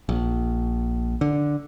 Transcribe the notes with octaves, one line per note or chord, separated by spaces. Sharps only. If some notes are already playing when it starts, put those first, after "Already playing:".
A#1
D3